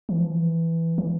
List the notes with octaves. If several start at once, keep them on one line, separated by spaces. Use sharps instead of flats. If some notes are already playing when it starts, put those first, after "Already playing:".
E3
F3
E3
E3